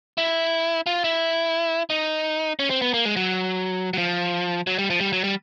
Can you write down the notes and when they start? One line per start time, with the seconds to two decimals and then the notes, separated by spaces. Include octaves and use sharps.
0.18 E4
0.86 F4
1.04 E4
1.90 D#4
2.59 C#4
2.70 C4
2.82 B3
2.94 A#3
3.05 G#3
3.17 F#3
3.93 F#3
3.98 F3
4.67 F#3
4.79 G3
4.90 F3
5.01 G3
5.13 F#3
5.24 G3